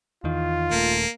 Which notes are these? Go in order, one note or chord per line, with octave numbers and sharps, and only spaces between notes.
E2 D#3 F4
D#1 A3 A#3